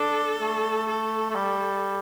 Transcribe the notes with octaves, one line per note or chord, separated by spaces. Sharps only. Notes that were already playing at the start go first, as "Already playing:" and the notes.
Already playing: D4 A4
A3
A4
A3
G3